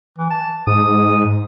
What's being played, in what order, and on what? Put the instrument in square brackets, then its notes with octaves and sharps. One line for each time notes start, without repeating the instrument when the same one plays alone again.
[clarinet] E3
A5
[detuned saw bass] G#2 [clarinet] D#6